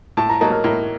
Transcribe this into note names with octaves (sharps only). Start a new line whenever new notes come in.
A2 A5
A#5
F#3 A#3 D#4 A5
A#4
A2 A#4